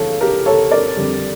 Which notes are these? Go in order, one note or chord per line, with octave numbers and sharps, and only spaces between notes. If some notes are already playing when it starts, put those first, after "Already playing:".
Already playing: E3 G3 A4 C#5 F5
G4 A#4
A4 C#5
A#4 D5
F2 D3 G3